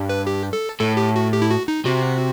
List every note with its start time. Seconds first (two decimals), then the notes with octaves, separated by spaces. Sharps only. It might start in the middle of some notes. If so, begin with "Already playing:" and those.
Already playing: G2
0.09 B4
0.27 G4
0.53 A4
0.80 A2 A4
0.97 G4
1.16 F#4
1.33 G4
1.42 E4
1.50 F#4
1.68 D#4
1.85 C3 F#4